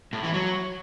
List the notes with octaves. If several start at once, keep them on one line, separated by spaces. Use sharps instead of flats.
A2
E3
F#3